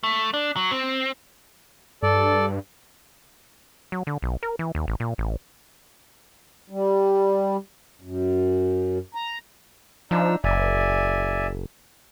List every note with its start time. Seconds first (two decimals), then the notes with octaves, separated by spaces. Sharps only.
0.03 A3
0.34 D4
0.56 F#3
0.71 C4
2.03 G2 A4 D5
3.92 F#3
4.07 D3
4.22 B1
4.43 A#4
4.59 E3
4.75 D#2
4.88 A1
5.00 A#2
5.18 A1
6.70 G3
8.01 F#2
9.15 A#5
10.11 F3 D4 D#4 E6
10.44 F#1 D5 E5 G#5